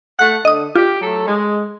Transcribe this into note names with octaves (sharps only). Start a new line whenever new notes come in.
A3 F#5 F#6
D3 D#5 D#6
F4 G4
F#3 A3 A4
G#3